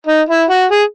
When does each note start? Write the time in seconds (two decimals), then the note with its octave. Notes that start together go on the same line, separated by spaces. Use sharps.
0.07 D#4
0.29 E4
0.50 F#4
0.71 G#4